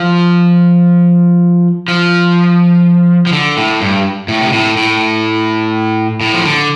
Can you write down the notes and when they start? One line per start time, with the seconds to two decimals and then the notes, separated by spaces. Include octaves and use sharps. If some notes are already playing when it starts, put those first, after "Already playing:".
Already playing: F3
1.88 F3
3.26 F3
3.33 D3
3.57 A2
3.81 G2
4.28 A2
4.41 C3
4.53 A2
4.77 A2
6.21 A2
6.34 F3
6.45 D3